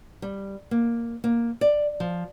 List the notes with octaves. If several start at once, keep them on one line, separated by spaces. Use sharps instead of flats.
G3
A#3
A#3
D5
F3